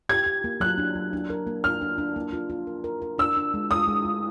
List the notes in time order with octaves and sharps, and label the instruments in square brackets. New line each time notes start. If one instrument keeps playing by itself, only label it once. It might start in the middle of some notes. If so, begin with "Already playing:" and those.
[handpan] G4 [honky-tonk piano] G#6
[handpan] G4
A#3
[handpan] F#3 [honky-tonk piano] F#6
[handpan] D4
F#3
D4
A#4
A#3
[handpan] D4 [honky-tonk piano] F6
[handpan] D4
D4
A#3
F4
F4
A#4
A#4
A#4
[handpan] D4 [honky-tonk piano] E6
[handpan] D4
G#3
[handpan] G#3 [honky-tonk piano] D#6
[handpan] G#3
G#3